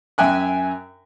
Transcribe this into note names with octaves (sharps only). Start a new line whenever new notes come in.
F#2 E5 G5 G#5 F#6